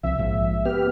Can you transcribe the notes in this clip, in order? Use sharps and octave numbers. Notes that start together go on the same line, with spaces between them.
C2 F3 C4 E5
A#1 G#2 F3
B3 G4 F6